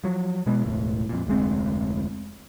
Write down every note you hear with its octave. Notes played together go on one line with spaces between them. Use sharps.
F3 F#3
B2 G#3 B3
E1 C#2 A2
F2 A#2
F1 D2 G#3 C4